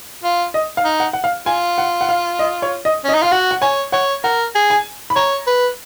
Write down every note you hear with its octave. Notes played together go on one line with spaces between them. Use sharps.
F4
D#5
F5
D#4
F#5
F#5
F5
F4 G#5
F#5
F#5
F5
D#5
C#5
D#5
C#4
D#5
D#4
F4 F5
F#4 F#5
F#5
C#5 G#5
C#5 F#5
A#4 F#5
G#4
G#5
B5
C#5 A#5
B4